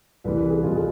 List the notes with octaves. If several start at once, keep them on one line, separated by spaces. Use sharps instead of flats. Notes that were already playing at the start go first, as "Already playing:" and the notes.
C2 C3 E3 B4
B4
G#4
C2 B2 F4
G#4